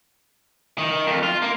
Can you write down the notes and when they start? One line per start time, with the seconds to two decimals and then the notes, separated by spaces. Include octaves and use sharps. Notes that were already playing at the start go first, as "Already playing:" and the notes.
0.78 D#3
1.07 F2
1.23 F4
1.42 A#3